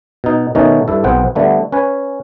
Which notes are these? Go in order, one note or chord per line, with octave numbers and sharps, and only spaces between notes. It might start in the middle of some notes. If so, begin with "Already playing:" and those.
B2 D#4
B2 D#3 A3 C#4 D#4
G2 E4 A4
B1 B3 C4 G#4 F#5 G5
D3 G3 A3 B3
C#4 B4 G#5